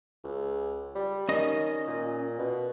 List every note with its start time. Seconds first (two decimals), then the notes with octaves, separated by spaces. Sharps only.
0.24 C#2
0.95 G3
1.29 D#3 C#4 D#5
1.87 A#2
2.39 B2